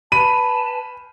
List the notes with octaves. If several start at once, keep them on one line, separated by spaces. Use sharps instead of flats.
B4 G#5 A5 B5 D#7